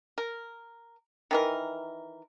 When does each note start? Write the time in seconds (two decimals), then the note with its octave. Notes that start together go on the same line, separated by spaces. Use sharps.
0.18 A#4
1.31 D#3 E3 A#4